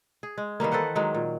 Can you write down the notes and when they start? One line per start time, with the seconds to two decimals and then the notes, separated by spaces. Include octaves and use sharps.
0.23 G#4
0.38 G#3
0.60 D#3 E3 G3 A#3
0.72 A4 B4 C5 F#5
0.95 D#3 F#3 G#3
1.15 A#2